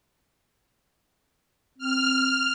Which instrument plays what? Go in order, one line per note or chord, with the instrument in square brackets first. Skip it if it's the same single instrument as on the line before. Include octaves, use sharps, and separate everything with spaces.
[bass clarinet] C4 [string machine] F6